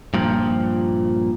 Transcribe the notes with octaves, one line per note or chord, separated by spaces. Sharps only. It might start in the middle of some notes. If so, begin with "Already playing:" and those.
G2 A#2 F3